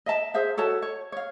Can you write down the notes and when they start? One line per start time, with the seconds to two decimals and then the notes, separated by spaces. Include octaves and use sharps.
0.06 D#5 E5 A5
0.34 G#4 C5 E5 F5
0.57 F#4 A4 C#5 A5
0.82 C#5
1.12 C#5 F5